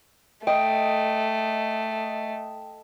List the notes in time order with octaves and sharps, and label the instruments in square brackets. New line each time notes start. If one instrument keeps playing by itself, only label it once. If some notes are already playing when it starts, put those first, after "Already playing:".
[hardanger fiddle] A3 [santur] D#5 [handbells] G5